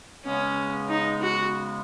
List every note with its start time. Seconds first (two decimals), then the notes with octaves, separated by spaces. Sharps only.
0.25 C#3 G#3 B3 C#4
0.89 D#4
1.22 F#4